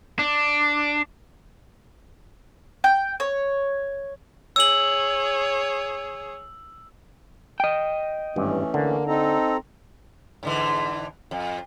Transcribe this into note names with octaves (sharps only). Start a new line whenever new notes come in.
D4
G5
C#5
G#4 C#5 E6 F#7
D#5 G5
G#1 G2 E3 A3 C#4
D3 A#3
C4 D#4 A4 A#5
G#2 D3 E3
F2